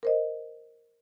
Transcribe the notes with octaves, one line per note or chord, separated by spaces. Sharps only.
A#4 C5 D#5